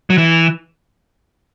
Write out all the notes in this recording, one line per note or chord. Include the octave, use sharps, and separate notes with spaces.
F#3
E3